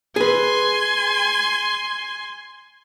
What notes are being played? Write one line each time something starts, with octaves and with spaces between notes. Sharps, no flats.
G#4 B4 G#5 C6